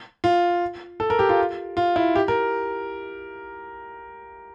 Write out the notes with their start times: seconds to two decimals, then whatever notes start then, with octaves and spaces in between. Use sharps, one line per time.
0.24 F4
1.00 A4
1.10 A#4
1.19 G4
1.29 F4
1.77 F4
1.96 E4
2.16 G4
2.28 A#4